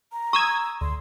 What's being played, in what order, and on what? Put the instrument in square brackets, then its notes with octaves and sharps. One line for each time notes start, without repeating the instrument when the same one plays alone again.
[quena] A#5
[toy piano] C#6 [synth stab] D#6 E6 G#6
[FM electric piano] D2 [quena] C6